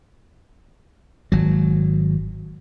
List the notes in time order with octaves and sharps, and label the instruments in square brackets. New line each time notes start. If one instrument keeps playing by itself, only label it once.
[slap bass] G#1 F#3